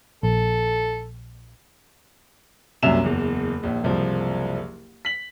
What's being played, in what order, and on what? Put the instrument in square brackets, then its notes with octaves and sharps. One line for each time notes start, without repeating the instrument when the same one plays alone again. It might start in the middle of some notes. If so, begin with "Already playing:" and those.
[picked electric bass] A#1 [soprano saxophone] A4
[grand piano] C2 F#2 A#2 E5 E7 F7
F#1 E2
A#1 D#2
F#1 C2 F3
B6 F#7